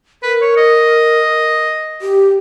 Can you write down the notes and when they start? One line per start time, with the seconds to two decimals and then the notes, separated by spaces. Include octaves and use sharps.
0.23 A#4 B4
0.41 C#5
0.57 D#5
2.02 G4